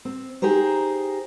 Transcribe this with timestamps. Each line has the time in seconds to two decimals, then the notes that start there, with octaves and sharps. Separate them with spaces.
0.05 C4
0.42 D#4 G4 G#4 A#4 C5